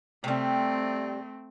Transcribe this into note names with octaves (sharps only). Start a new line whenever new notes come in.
C3 G3 A3 C4